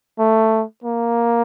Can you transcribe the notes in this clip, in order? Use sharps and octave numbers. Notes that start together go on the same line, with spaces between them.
A3
A#3